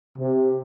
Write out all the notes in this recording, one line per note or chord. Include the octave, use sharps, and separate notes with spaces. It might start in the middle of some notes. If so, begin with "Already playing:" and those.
C3